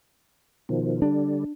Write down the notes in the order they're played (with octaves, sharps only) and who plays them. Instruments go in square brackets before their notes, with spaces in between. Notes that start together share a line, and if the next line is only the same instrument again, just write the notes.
[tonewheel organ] B2 D#3 F3
[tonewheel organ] D3 G3 [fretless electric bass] D4